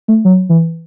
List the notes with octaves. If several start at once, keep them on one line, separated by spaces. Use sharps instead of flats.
A3
F#3
E3